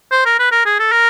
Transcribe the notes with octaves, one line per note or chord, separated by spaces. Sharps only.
C5
A#4
B4
A#4
G#4
A4
A#4